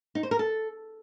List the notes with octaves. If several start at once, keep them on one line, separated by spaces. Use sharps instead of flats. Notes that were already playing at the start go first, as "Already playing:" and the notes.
D#4
C5
A#4
A4